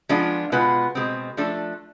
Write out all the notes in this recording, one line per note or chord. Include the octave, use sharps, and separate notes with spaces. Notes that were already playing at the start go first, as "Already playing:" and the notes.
F3 G#3 B3 D4 F4
B2 G#3 B3 F4 B4
B2 G#3 C4
F3 A3 D4 A4